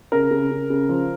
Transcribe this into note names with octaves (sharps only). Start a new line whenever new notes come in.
C#3 A#4
C#3
C#3
C#3
F3